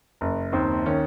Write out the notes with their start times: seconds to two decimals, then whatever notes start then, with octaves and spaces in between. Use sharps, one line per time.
0.21 F#1
0.52 D#2 C4
0.86 D#3 C#4